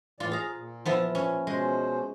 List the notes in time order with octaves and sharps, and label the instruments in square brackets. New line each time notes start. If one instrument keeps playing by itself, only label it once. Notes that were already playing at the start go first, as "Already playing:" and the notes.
[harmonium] A2 E3 D5 [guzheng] F4
[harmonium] G#4 [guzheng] F5 A#5
[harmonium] A#2
[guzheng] F3 B3 E4
C#4
[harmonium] B2 C#4 C5 [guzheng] G#3